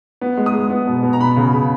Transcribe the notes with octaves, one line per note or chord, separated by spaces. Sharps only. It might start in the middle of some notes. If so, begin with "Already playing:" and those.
B3
G#3
D#6
G#3
B3
B2
B2
A#5
B3 B5
C#3
C#3